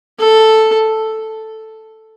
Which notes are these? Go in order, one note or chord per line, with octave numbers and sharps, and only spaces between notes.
A4